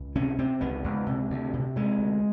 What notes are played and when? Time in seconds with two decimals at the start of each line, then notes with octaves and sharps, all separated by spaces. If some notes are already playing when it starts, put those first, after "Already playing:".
Already playing: C#2
0.15 C3 C#4
0.38 C3 C4
0.61 C#2 B3
0.84 C#2
1.06 C3
1.30 D2
1.53 C3
1.76 C3 G#3
1.98 D2